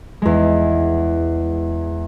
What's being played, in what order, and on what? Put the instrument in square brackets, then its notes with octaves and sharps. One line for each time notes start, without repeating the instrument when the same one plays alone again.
[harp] E2 G#3